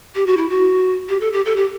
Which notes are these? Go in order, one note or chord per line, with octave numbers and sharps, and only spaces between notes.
G4
F#4
E4
F#4
G4
A4
G4
A4
G4